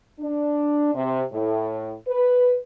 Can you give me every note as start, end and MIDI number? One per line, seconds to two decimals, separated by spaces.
0.20 0.92 62
0.94 1.22 48
1.32 1.93 45
2.08 2.58 71